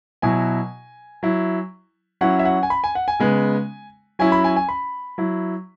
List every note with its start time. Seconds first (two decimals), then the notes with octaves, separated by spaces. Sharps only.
0.22 B2 F#3 E4 G#5
1.23 F#3 E4
2.21 F#3 C#4 E4 F#5
2.39 E5
2.45 F#5
2.63 G#5
2.70 B5
2.84 G#5
2.95 F#5
3.08 G#5
3.20 C#3 G#3 B3
4.19 F#3 C#4 E4 G#5
4.32 B5
4.44 G#5
4.56 G#5
4.69 B5
5.18 F#3 E4